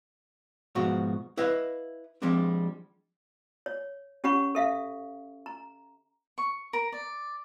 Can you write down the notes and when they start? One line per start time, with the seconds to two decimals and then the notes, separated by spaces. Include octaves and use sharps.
0.75 G#2 B2 F3 F#4
1.37 E4 B4 D#5 F5
2.22 F3 G3 G#3 C4 D4
3.66 C#5
4.24 C#4 G4 C#5 F#5 B5 C#6
4.55 A4 E5 F5
5.46 A#5
6.38 C#6
6.73 A#4
6.92 D5